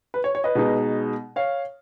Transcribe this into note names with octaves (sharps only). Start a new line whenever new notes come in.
B4
C#5
C#5
B4 D#5
B2 G#3 D#4
C#5 F5